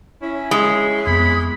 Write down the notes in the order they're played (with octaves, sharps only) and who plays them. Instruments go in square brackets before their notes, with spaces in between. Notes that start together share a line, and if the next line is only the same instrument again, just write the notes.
[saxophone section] C#4 E4
[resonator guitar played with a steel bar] G#3
[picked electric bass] F2 A#3 B3 [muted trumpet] B5